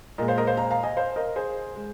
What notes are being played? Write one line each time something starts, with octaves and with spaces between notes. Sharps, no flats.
A#2 G#3 A#4 D#5
C5 F5
A#4 D#5
C5 F5
F5 A#5
F5 A#5
D#5 G#5
C5 F5
A#4 D#5
G#4 C5
G#3